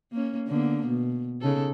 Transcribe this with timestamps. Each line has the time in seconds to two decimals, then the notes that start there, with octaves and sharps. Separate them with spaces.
0.12 A#3 C#4
0.47 D3 A#3 B3
0.87 B2
1.41 C#3 D#4 A4